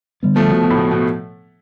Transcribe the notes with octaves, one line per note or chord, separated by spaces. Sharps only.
D3 G3 B3
F3 A3
B2
B2
A2
B2
B2